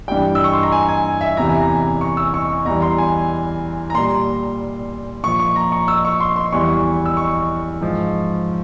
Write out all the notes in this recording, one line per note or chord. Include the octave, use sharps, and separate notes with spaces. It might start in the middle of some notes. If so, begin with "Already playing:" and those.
G2 E3 G3 G5
E6
C#6
C6
A#5
G#5
G#5
E5
E2 C3 E3 A#5
G#5
A#5
C#6
E6
C#6
E2 E3 G3 A#5
C6
G#5
A#5
A#2 G3 C6
A#2 F3 C#6
C#6
A#5
C#6
E6
C#6
C6
C6
E2 E3 G3 C#6
E6
C#6
G#2 F3